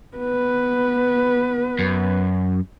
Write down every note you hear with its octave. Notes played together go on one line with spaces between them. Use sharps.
B3 B4
F#2